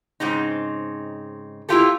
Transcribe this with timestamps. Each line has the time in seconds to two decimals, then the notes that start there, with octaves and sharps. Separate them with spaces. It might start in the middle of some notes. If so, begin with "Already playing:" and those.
0.20 G#2 C#3 C4 D#4
1.69 A3 A#3 E4 F4 G4 A4